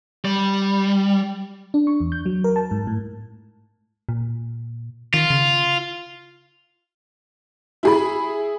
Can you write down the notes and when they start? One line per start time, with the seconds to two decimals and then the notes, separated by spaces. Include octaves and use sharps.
0.25 G3
1.74 D4
1.87 C#6
2.00 E2
2.12 G6
2.26 F#3
2.44 A#4
2.56 A5
2.71 G#2
2.87 A2
4.09 A#2
5.14 D#3 F4
5.30 C#3
7.83 E4 G#4 B5